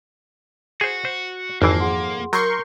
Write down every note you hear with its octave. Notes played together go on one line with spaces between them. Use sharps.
F#4 G#4 C5
C5
G#1 F2 E3 A#3 A5 C7
G#4 F#5 C6
F#3 A#4 C6 C#6 G6 C7